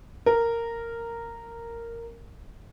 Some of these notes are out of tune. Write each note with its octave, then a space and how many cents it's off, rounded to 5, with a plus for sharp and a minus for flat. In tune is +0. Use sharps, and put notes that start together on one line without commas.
A#4 -10